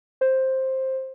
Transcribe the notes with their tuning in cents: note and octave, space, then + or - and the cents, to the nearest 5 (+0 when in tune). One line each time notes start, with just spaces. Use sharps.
C5 +10